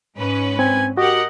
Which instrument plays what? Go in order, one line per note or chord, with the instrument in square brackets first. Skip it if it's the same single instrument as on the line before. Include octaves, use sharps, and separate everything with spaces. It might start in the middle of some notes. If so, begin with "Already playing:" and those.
[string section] G#2 C#4 B4
[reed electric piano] C4 [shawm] G#5
[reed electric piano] F#4 [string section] G4 A#4 F#5 [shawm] D#5